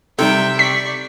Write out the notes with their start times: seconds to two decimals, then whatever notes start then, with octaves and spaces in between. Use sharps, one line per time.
0.19 C3 G3 D#4 A4 E5 G5
0.59 D5 C#6 B6